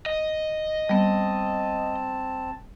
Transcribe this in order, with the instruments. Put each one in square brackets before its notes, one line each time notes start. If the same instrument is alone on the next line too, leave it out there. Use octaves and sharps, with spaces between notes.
[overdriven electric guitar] D#5
[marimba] G3 B3 [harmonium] C4 A5